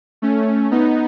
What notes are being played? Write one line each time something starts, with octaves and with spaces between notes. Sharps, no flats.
A3 C#4
B3 D#4